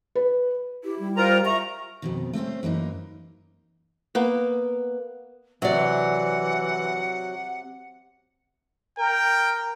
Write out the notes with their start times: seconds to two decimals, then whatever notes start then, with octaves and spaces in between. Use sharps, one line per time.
0.15 B4
0.84 E4 G4
0.99 G3
1.17 F4 A#4 C5 A#5
1.45 E5 A#5 C#6
2.02 F2 B2 D#3
2.33 A3 C4 C#4 C5
2.63 F#2 E3 A#3 D#4
4.15 A#3 B3
5.62 C3 E3 F#3 D5 F#5
8.98 A#4 G5